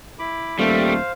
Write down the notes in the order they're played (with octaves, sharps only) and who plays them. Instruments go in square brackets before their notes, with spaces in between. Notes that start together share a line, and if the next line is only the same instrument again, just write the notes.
[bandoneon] E4 B5 D6
[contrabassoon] D#1 [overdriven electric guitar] G3 [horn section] A3 [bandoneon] C5 F5